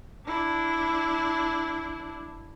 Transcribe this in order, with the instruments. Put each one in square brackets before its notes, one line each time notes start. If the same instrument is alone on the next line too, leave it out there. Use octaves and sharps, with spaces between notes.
[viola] D4 E4